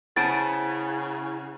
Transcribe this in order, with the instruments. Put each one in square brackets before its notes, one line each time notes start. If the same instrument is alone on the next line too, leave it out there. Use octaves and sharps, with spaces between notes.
[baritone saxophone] C#3 [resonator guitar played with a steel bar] B3 C5 A5 [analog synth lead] E4 [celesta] A6 D7